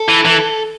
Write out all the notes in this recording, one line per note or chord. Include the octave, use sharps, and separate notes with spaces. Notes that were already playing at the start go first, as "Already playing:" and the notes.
Already playing: A4
E3
E3